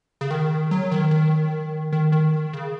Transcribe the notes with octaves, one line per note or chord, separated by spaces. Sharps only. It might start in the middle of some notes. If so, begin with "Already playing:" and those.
C#3
D#3
F#3
D#3
D#3
D#3
D#3
C#3